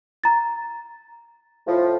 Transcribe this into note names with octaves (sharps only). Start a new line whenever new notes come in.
A#5 A6
A2 F3